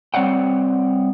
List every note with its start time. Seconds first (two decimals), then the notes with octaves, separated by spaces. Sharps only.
0.14 G3 C4 C#5 D5 F#5 G5